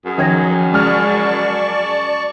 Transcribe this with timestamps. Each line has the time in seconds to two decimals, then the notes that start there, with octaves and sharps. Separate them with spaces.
0.05 F#2 G#4
0.18 D#3 F3 C#4 G#6 A#6
0.73 C#3 G#3 G#4 D5 A5 C#6 F6